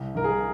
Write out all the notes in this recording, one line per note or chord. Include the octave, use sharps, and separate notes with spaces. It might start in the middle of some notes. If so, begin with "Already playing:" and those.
Already playing: C2
C2 A#4
G#4